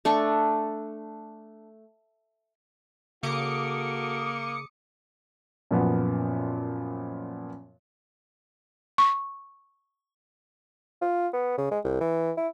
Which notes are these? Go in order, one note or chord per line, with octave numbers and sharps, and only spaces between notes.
A3 D4 C#6
C#3 A#3 F#4 A4 D6 D#6 C#7
F#2 A#2 F3 B3
C#6
F4
B3
C#3
G#3
C2
E3
E4